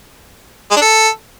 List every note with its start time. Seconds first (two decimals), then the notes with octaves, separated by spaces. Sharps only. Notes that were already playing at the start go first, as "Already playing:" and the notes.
0.71 G#3
0.76 D4
0.81 A4